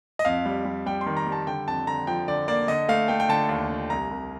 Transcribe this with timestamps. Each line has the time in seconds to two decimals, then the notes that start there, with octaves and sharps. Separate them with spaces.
0.19 D#5
0.25 F2 F5
0.46 G3
0.65 G3
0.86 G3 G5
1.01 C6
1.06 D#3
1.17 A#5
1.27 G3
1.32 A5
1.47 D3 G5
1.67 F2 A5
1.87 D3 A#5
2.07 F3 G5
2.28 D3 D5
2.48 A#3 D5
2.68 D3 D#5
2.88 A3 F5
3.08 A3 G5
3.20 G5
3.29 D3 A5
3.49 D#2
3.69 D3
3.90 C2 A#5
4.11 C2